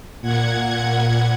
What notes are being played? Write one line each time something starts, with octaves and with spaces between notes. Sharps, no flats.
A#2 F#5 G#6